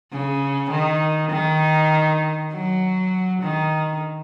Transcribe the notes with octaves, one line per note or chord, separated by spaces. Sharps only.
C#3
D#3
D#3
F#3
D#3